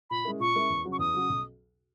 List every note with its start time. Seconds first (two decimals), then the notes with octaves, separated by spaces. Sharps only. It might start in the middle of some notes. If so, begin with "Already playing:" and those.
0.10 A#2 B5
0.25 G#3 C#4 E4 A#4
0.40 A#2 C#6
0.55 G#3 C#4 E4 A#4
0.70 E2
0.85 C#3 F#3 C#4 F#4
0.92 C#6
0.99 E2 D#6
1.13 C#3 F#3 C#4 F#4
1.29 B1